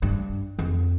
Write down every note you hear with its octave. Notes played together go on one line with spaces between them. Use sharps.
G2
F2